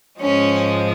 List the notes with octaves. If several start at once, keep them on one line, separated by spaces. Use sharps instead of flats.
G#2 F3 G#3 C#4